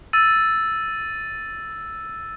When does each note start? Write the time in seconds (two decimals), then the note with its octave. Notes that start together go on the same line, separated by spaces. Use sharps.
0.13 E6 A6 D#7